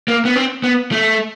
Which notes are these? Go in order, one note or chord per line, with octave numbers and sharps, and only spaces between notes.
A#3
B3
C4
B3
A3